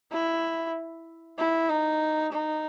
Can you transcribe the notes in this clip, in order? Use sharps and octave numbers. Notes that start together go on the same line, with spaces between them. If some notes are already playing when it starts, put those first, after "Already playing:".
E4
E4
D#4
D#4